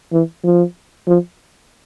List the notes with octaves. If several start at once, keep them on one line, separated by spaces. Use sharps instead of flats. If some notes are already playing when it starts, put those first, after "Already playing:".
E3
F3
F3